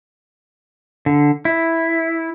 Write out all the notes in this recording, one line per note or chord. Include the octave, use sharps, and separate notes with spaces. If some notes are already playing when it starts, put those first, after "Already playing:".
D3
E4